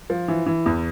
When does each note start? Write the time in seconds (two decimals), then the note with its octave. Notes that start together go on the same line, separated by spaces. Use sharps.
0.10 F3
0.28 E3
0.46 E3
0.66 E2